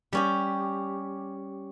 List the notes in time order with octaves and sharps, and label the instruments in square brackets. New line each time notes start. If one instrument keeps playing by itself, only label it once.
[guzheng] G3 C#4 G4